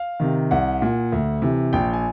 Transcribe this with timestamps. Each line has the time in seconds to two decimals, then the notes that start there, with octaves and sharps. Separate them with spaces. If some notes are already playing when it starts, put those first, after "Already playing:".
Already playing: F5
0.20 C3 D#3
0.51 C2 F#5
0.82 A#2
1.12 D2
1.42 C3 E3
1.73 A#1 G5
1.94 G#5